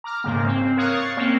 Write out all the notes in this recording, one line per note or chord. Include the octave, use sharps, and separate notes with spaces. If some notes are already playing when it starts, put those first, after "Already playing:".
A#5 D6 F6
G#2 C#3 A#3
C4
A#4 C#5 F5 D#6 F#6
C#6 A6 C7
A#3 C4 C#4